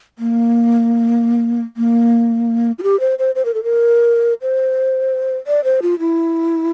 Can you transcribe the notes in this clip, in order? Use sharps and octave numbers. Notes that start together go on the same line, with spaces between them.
A#3
A#3
F4
G4
C5
C5
C5
A#4
A4
A#4
C5
D5
C5
F4
E4